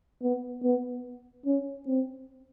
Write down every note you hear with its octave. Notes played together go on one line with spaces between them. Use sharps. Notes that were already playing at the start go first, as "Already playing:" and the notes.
B3
B3
C#4
C4